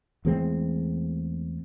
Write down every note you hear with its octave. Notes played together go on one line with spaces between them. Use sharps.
E2 A2 G#3 C4